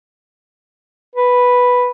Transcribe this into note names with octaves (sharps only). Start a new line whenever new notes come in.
B4